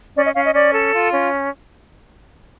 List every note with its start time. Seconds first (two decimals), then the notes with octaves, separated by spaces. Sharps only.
0.15 C#4 D5
0.25 D#5
0.35 C#4 F5
0.44 D#5
0.54 C#4 D5
0.73 A4
0.93 F4
1.13 C#4